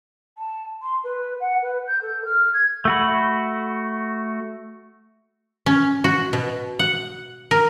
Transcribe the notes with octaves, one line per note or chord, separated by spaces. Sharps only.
A5
C6
B4
F#5
B4
G6
A4
F6
G#6
A3 F#4 B5
C#4
F#4
B2
F#5
A#4